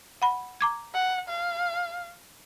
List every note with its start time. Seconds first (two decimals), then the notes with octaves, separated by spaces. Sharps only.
0.22 F#5 B5
0.61 A#5 D6 G#6
0.94 F#5
1.29 F5